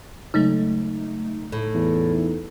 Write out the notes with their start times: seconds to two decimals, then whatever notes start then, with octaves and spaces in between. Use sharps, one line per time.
0.34 C#3 F#3 G#3 A3 D#4
1.52 A2
1.74 E2